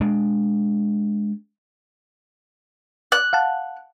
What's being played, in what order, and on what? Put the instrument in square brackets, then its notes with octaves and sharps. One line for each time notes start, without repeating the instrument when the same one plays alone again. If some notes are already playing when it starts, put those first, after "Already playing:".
[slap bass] G#3 D4
[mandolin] F#6
[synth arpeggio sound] F5 F#5 A5